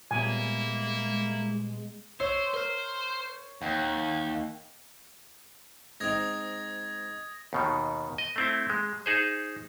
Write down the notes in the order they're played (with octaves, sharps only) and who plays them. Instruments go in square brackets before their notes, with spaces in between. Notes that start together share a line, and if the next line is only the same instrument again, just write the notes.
[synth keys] A#2 G3 B3 [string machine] G#3 [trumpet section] A#3 E4 [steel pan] G#5
[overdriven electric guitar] C5 [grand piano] C#5 [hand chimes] E6
[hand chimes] A#4 F6 [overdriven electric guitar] C5
[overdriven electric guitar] D#2 [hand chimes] F#5 G5
[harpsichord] G#2 C4 D#4 [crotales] D#6 G#6 A#6
[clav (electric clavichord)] D#2 B2 D#3
D#5
A3 C4 E4
G#3
D#4 G#4 C5